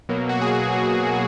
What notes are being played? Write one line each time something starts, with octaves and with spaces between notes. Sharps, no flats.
B2 F#3 A#3
F#4
G#4